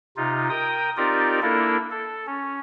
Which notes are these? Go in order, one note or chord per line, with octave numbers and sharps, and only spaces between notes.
C3 D#4 F4
A#4 G5 D#6
C4 D#4 F4 G4 A#4 D5
A#3 D4 E4 A4 A#4
A4
C#4